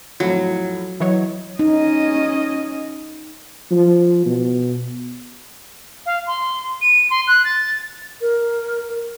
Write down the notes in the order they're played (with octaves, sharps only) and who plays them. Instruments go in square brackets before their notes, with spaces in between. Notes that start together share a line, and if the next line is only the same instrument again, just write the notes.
[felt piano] F2 A2 F3 [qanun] F#3
[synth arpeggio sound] E3 F#3 C#5 [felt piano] B4 D#5
[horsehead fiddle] C#4 D#5 [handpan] D#4
[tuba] F3
B2
[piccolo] F5
C6
D#7
C6
F#6
A6
[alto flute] A#4